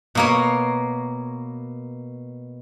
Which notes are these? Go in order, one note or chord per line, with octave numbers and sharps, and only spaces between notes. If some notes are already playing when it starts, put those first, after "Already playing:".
B2 A#3 C#5